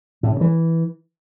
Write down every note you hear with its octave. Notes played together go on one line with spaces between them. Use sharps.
A2
C#3
E3